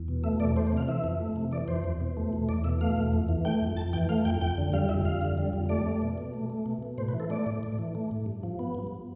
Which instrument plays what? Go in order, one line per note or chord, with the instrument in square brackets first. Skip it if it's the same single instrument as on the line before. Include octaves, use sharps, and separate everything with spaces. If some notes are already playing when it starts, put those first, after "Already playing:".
Already playing: [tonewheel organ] E2
B2
A3 E5
E2 D5
A3 C5
C5
C3 F5
E3 E5
F2
A3
C3
E3 D5
F2 C5
E2
B2
A3
E2
E2 D5
B2 E5
A3 F5
E2
F2
E3
A3 G5
F2
F2 A5
E3 G5
A3 F5
F2 G5
F2 G5
D3
G3 F5
F2 E5
F2 F5
D3
G3
F2
A3 D5
A3
B2
B2
A3
A3
B2
B2
A2 C5
B4
E3
A4
A3 D5
A2
A2
E3
A3
A2
G2
F3
B3
G2